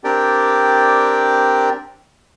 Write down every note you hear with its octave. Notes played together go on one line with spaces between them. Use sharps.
C4 D4 G4 A#4 D5 G5